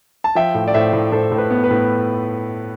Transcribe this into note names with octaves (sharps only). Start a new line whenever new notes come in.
A5
F3 E5 G5
A2
D5
A2 C5 E5
A2
A2 A4 C5
A2
B4
B3
B4
A2